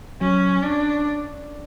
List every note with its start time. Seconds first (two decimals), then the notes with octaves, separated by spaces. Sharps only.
0.21 F#3 C#4
0.63 D4